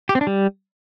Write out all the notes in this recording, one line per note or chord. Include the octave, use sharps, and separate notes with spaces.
G4
C4
D4
G3